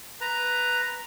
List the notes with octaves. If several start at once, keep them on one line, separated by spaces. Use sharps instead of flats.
B4 A#5